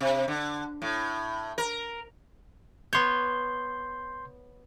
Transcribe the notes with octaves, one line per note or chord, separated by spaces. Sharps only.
C3
D3
A2
A#4
B3 C#5 C6 G6